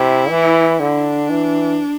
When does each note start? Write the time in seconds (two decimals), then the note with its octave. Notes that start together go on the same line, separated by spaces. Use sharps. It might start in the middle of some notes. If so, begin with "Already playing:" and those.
Already playing: C3 E4
0.30 E3
0.79 D3 D4
1.30 E3